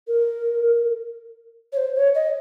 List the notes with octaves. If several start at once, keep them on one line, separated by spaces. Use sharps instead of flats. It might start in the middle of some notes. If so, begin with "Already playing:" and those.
A#4
C#5
C5
C#5
D#5